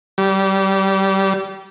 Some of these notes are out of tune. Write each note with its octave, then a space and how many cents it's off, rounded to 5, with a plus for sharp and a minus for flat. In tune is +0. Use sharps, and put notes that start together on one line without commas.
G3 -25